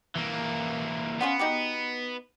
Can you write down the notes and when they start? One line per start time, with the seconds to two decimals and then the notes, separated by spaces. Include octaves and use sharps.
0.16 E3 A#3
1.21 B3 C#4 F4 F#5
1.39 D#4 F#4 G4